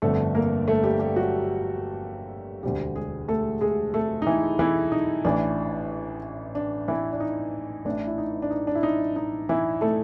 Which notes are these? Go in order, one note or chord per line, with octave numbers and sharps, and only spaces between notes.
G1 F2 D3 A3 A4
A#3 A#4
A3 A4
G3 G4
G3 G4
F#3 F#4
E1 D2 D3 G3 G4
G#3 G#4
A3 A4
G#3 G#4
A3 A4
D#4
E3 E4
E3 E4
D#4
A1 A2 E3 D4
D4
E3 E4
D4
D#4
A1 A2 E3 D4
E4
D#4
D4
D#4
D4
E4
D#4
D#4
E3 E4
A3 A4